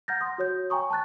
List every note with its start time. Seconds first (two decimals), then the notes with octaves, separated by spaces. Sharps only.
0.08 F#5 A#5 F6 G6 A6 A#6
0.21 C6 D#6
0.38 F#4 C#5 G6
0.70 G5 G#5 A#5 C#6 D#6
0.90 A5 A#5 F#6 A6